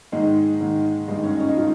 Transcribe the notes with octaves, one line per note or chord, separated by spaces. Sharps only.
G#2 D#3 G#3
G#2 D#3
G2 D#3 G#3
C#4
D#4
C#4
D#4
D#3 F4